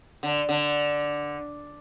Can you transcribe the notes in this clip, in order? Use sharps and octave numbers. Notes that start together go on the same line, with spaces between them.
D3
D3